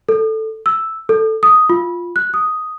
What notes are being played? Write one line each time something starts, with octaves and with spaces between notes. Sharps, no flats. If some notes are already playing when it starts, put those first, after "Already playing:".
A4
E6
A4
D#6
F4
F#6
D#6